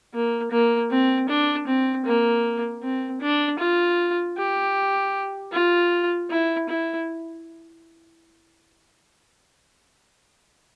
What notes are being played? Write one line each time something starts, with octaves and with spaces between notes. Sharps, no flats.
A#3
A#3
C4
D4
C4
A#3
C4
D4
F4
G4
F4
E4
E4